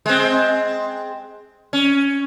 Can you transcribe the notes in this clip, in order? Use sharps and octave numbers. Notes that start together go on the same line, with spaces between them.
G#3 C4
C#4